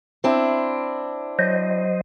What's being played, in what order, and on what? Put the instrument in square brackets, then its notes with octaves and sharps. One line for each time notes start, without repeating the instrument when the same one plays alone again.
[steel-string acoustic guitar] C4 D4 E4
[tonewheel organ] F#3 C5 D#5